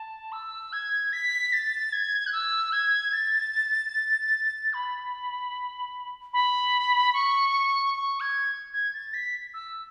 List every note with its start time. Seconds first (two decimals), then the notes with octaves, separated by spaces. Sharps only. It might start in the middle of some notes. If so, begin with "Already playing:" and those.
Already playing: A5
0.32 E6
0.73 G#6
1.13 B6
1.53 A6
1.92 G#6
2.27 F#6
2.33 E6
2.72 G#6
3.13 A6
4.73 B5
6.33 B5
7.13 C#6
7.94 C#6
8.20 G#6
8.74 G#6
8.94 A6
9.14 B6
9.54 E6